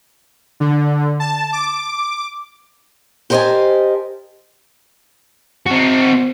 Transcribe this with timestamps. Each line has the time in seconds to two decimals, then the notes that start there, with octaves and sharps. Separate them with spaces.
0.60 D3
1.20 A5
1.53 D6
3.30 G4 A#4 C5 D#5 G#5 A5
5.67 C4 F#4